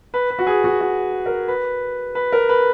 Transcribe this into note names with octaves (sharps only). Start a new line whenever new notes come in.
B4
B4
F#4
G#4
F#4
F#4
A#4
B4
B4
A#4
B4